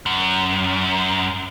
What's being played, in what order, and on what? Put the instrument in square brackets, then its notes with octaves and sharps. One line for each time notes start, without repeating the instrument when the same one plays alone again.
[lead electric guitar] F#2